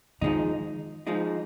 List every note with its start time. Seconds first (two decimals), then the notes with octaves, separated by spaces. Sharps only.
0.21 D#3 F3 G#3 D#4
1.07 F3 G#3 D#4